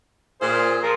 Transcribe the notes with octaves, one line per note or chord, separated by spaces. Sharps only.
A#2 F4 G#4 C5
F3 A#4